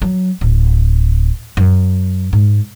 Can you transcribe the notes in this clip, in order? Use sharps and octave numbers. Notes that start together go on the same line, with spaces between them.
F#3
D1
F#2
G#2